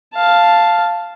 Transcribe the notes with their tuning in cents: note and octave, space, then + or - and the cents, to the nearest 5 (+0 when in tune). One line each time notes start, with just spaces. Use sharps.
F5 -5 A5 +0